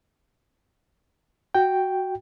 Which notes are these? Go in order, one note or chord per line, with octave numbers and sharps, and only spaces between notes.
F#4 G5